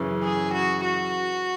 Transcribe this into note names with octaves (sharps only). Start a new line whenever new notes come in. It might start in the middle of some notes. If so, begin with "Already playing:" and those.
Already playing: F#2 C#3 E3
G#4
F#4
F#4